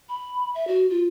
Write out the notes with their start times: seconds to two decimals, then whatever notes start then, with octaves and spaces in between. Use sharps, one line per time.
0.09 B5
0.55 E5
0.68 F#4
0.90 F4